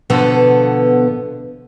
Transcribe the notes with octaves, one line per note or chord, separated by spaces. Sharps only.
B2 D3 F3 B3 A4 A5